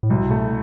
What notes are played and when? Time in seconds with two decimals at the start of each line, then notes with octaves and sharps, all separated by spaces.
0.03 A2
0.10 C2 B2
0.31 A3